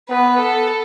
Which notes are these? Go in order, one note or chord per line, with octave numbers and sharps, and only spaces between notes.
B3 B4
A4